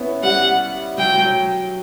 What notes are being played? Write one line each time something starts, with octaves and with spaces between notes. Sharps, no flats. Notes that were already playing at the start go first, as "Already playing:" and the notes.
Already playing: B3 C#4 E4
G3 F#5
F#3 G5
F#3